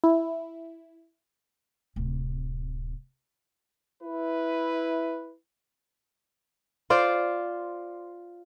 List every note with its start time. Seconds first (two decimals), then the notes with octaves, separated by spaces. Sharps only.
0.04 E4
1.96 D1 C3
4.03 E4 B4
6.90 F4 C5 D5